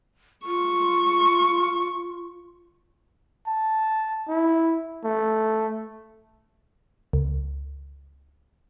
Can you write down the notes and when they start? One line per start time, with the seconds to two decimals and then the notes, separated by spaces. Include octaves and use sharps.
0.46 F4 C#6
3.47 A5
4.28 E4
5.04 A3
7.13 C#2